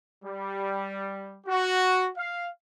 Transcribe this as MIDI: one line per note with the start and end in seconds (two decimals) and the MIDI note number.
0.24 1.38 55
1.47 2.08 66
2.18 2.48 77